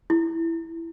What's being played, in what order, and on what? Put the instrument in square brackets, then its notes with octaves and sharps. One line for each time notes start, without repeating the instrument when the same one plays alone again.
[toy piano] E4